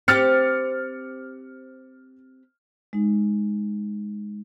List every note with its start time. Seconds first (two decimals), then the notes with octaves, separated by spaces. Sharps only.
0.08 C4 G4 F6 A6 C#7
2.93 G#3 D#4